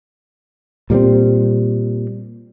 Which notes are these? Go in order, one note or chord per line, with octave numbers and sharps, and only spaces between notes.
A#2 G3 A#3 C4